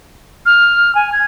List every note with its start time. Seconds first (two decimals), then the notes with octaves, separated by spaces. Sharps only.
0.46 F6
0.95 G#5
1.12 G#6